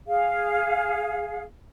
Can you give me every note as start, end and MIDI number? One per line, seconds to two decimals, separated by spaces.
0.07 1.43 68
0.07 1.43 77